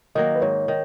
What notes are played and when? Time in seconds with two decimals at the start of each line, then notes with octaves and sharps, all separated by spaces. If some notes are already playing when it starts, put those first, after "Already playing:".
0.15 D#3 F#3 A#3 D#5
0.36 B4
0.42 G#2 C#5
0.68 D#3